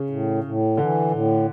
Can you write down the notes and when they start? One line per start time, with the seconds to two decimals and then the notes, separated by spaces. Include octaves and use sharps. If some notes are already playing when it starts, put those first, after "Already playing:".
Already playing: C#3
0.10 A2
0.44 A2
0.77 D3 E3
1.12 A2